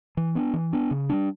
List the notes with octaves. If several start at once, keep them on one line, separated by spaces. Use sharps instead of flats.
E3
B3 D4
E3
B3 D4
C#3
G3 B3 D4